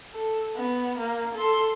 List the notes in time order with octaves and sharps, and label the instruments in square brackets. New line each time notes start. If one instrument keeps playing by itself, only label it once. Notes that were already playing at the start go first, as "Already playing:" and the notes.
[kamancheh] A4
B3
A#3
A4 C6